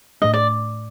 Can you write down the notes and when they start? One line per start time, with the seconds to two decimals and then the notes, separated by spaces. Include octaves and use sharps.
0.22 A2 A3 D4 D#5
0.34 D5